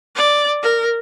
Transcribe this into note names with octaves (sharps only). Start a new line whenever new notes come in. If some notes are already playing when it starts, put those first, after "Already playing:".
D5
A#4